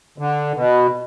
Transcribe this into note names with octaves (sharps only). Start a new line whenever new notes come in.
D3
B2